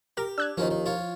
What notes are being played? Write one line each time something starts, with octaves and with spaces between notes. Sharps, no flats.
G4 A#4
D4 E6 F#6 G#6
D#2 D#3 F3 C4 C#4 E4
D#3
F4 C#5